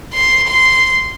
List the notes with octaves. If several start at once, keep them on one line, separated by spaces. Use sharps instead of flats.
C6
C6